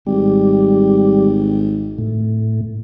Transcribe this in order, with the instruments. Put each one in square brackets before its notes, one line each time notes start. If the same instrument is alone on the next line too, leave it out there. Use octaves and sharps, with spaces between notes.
[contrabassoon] G#1 [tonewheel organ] G3
[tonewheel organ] A2